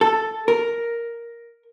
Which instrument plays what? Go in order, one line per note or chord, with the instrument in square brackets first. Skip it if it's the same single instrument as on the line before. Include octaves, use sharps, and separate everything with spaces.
[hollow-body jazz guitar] A4
A#4